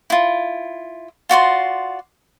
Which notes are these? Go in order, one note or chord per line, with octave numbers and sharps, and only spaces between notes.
E4 F4
F4 F#4 D5 C6